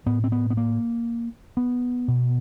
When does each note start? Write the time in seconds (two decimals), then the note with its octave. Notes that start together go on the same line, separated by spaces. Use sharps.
0.06 A2 B3
0.24 C4
0.32 B3
0.50 B3
0.57 A#3
1.57 B3
2.08 B2